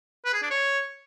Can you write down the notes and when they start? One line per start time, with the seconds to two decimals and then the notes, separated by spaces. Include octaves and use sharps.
0.25 B4
0.34 G#4
0.42 D4
0.51 C#5